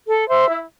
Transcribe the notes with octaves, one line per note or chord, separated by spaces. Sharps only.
A4
C5 E5
E4